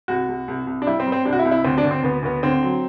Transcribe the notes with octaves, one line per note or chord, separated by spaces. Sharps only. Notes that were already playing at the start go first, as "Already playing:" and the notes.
C2 F#4
C2
C2
C2
D4
G3 E4
C4
G3
C4
C2 D4
F#4
E4
C2
E4
D2 C4
D4
D2
C4
D2 B3
D2 B3
D3 C4
F#3